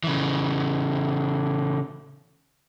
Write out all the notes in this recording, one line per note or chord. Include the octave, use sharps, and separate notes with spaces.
C#3 E3